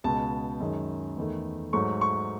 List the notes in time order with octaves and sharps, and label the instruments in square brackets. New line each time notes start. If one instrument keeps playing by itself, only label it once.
[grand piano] C#2 B2 G#3 A5
F#2 D#3 G#3
E2 D#3 A3
G#2 F#3 A3 C#6
C#6